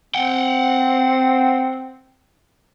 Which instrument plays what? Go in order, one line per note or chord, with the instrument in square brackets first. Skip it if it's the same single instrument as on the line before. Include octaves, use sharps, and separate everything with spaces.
[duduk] C4 [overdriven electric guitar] F#5 G5